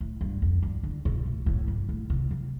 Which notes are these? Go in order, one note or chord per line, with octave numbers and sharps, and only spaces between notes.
A2
G2
F2
G2
D3
B2
A2
A2
G2
A2
C3
F3